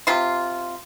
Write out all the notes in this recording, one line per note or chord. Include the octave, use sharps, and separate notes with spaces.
C3 F4 C6